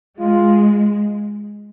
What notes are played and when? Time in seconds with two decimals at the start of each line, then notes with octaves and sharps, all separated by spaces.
0.20 G#3 F4